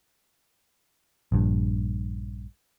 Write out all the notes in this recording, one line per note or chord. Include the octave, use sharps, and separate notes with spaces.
A#1 G2